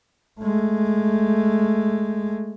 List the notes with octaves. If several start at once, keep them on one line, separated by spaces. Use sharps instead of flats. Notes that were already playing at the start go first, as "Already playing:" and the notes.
G#3 A3